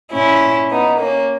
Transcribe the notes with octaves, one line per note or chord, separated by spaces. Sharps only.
A#2 C#4 E4
B3 D#4
A#3 C#4